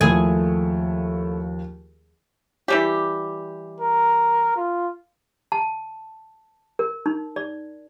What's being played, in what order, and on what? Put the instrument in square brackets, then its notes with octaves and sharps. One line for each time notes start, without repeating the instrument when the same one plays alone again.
[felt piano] D#2 F3 [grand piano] A3 E4 A4 [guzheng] G#4 G#5
[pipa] E3 G3 G4
[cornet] A#4
F4
[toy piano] A5
A#4
D#4
D5